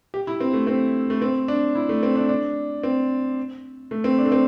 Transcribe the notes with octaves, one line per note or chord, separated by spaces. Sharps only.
G4
E4
C4
A3
C4
A3
C4
D4
E4
A3
C4
D4
D4
C4
A3
C4
D4
A3
C4